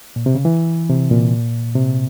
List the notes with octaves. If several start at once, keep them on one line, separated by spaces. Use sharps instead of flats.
A#2
C3
C#3
E3
C3
A#2
C3